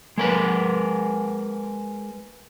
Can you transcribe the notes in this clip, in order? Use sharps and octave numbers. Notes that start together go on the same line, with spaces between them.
G#3 A#4 B4